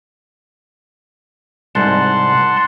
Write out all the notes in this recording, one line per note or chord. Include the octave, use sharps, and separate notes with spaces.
C2 G#2 F#5 A5 C6